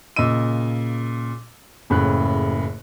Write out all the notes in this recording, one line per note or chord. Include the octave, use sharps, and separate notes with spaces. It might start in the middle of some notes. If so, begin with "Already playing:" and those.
A#2 C#3 D#5 E6 D#7
F#1 A2 C#3 F#6